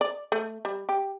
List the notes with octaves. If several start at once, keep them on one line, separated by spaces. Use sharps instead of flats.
D5
A3
G3
G4